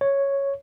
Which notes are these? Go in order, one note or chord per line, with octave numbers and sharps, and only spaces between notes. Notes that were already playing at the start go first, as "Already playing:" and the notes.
C#5